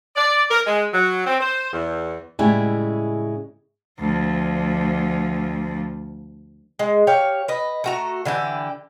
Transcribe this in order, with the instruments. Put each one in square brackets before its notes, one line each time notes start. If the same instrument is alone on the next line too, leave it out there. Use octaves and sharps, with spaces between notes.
[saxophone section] D5
A#4
G#3
F#3
C4
C5
E2
[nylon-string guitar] A2 C#3 G3 G#3 C#4 E4
[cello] D2 F3
[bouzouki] G#3
G4 C#5 F5
B4 D#5
A3 F#4 A#5
D3 E3 E4 G4